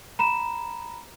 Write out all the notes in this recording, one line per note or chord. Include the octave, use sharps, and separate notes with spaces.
A#5 B5 E7